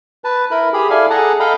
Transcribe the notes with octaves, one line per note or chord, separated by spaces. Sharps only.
B4 A5
E4 A#4 B5
G4 G#4 B5
E4 A4 D5 F5 G#5
G#4 A4 F#5 A5 A#5
A4 D#5 F5 G5 A#5 B5